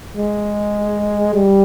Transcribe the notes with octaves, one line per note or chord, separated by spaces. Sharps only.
G#3
G3